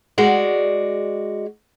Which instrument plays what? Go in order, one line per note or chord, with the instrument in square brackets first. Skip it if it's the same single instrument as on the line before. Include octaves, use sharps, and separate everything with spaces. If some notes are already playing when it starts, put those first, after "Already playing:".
[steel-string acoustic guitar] G#3 F#4 D5